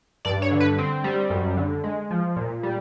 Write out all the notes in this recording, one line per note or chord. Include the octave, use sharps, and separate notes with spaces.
G2 D5
C#5
D3
B4
C4
G3
F#2
D3
G#3
F3
A#2
G3